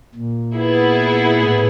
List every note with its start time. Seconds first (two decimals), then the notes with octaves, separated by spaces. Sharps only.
0.15 A#2
0.57 B3 E4 G#4
1.38 A2